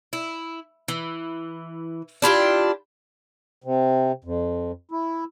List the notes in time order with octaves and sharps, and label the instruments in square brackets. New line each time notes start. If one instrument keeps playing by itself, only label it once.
[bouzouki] E4
E3
D4 E4 F4 G4
[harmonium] C3
F2
E4